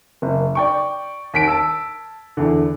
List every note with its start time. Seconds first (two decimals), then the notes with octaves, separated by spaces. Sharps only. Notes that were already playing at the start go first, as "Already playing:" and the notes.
0.22 F#1
0.55 D5 G5 C#6
1.34 D#2 B6 D7
1.48 A5 E6
2.37 E2 D3